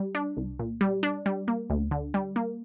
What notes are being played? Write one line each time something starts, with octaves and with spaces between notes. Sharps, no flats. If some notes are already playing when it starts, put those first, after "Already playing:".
Already playing: G3
D4
C2
A#2
G3
D4
G3
A#3
D2
D3
G3
A#3